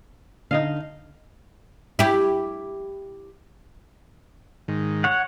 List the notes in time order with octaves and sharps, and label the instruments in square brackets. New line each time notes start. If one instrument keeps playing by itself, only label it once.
[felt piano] D3 [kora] D#4 D#5 F5
[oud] E4 G4
[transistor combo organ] G#2 D#3
[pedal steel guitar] C#5 F#5